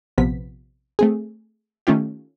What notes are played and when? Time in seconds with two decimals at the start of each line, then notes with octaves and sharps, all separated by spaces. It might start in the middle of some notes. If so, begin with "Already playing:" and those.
0.18 A#1 C3 F3 B3 B6
0.99 A3 C4 G#4
1.87 D#3 A3 C#4 F4 G4